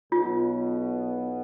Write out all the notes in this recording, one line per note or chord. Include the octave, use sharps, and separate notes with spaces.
B1 B2 B3 F4